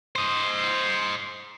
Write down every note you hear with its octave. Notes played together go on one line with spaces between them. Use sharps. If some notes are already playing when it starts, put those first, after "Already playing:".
C5 D#5